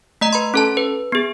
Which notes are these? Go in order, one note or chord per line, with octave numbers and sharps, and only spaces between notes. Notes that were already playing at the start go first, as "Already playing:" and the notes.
A3 D#5 A#5
B4 B5 C6
C#4 A4 A5
B4
B3 G#4